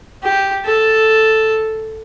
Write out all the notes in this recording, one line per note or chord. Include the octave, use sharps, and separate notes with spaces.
G4
A4